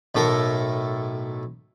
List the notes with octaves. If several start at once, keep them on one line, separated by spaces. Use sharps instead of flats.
B1 A2 A4 A#4